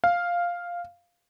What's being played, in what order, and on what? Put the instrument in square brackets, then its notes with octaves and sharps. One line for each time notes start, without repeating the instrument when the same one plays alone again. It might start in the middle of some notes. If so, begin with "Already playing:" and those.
[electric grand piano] F5